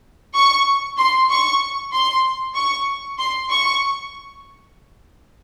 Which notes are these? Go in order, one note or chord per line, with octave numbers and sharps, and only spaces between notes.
C#6
C6
C#6
C6
C#6
C6
C#6